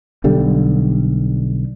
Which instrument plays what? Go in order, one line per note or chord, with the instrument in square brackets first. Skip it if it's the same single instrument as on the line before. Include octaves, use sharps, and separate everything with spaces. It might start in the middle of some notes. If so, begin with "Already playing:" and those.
[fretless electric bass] B1 D3 G3